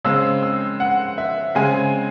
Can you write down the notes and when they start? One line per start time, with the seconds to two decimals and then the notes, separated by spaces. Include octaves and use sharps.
0.05 C#3 G#3 C4 E6
0.42 E6
0.80 F#5
1.18 E5
1.55 C#3 G#3 C4 G#5